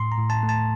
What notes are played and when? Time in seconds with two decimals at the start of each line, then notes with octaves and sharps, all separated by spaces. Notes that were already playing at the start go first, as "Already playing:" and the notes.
Already playing: A2 C6
0.12 A#5
0.17 A2
0.30 A5
0.43 A3
0.49 A5